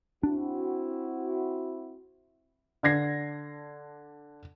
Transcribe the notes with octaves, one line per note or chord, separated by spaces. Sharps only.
C4 D4 E4 F#4
D3 D4 G#6 A#6 C7